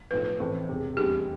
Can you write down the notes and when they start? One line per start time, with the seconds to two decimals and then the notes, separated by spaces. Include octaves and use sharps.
0.11 B1 A2 F3 B4
0.25 B4
0.40 A1 A2 E3 A3 C4
0.69 E1 E2 C3
0.97 F1 E2 C3 G3 D4 G4